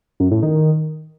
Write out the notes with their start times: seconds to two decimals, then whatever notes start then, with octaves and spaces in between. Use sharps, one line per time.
0.20 F#2
0.31 A2
0.43 D#3